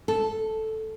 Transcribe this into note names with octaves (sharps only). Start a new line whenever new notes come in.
A4